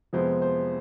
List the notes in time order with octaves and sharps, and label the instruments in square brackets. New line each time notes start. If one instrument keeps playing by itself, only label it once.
[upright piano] F2 C3 F3 G#3 B3 C5
C5